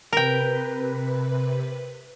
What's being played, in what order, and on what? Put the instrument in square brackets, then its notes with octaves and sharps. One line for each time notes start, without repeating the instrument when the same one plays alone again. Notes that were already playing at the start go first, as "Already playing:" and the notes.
[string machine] C3 B4 [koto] A#4 G5